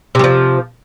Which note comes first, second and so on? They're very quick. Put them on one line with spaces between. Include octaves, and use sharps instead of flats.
C3 G3 F3